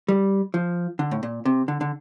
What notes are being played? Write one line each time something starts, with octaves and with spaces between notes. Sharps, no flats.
G3
F3
D3
A2
A#2
C3
D3
D3